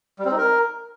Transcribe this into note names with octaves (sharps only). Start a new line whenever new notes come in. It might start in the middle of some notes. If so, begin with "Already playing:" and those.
G3
C4
D#4
A#4